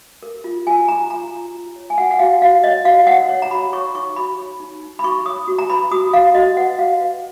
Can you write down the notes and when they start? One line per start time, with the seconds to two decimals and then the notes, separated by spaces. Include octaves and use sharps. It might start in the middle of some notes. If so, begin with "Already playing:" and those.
0.23 A#4
0.44 F4
0.67 F4 G#5
0.88 F4 A#5
1.10 F4 A#5
1.32 F4
1.54 F4
1.76 C#5
1.90 G#5
1.98 F#4 F#5
2.11 F#5
2.19 F#4 F5
2.42 F#4 F5
2.63 C#5 D#5
2.85 F#4 F5
3.07 C#5 F#5
3.29 C#5
3.42 A#5
3.51 F#4 B5
3.73 C#5 C#6
3.95 D#4 C#6
4.16 F#4 B5
4.38 C#5
4.60 D#4
4.83 D#4
4.99 B5
5.04 F#4 C#6
5.26 C#5 D#6
5.48 F#4
5.58 A#5
5.69 B4 B5
5.91 F#4 D#6
6.13 F#4 F5
6.35 F#4 D#5
6.57 B4 F#5
6.79 F#4 F5
7.01 B4